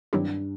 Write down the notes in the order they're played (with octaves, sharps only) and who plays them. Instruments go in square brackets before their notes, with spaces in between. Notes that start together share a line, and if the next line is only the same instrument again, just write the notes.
[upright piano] G2 [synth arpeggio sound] D#3 F#3 C4 E4 G4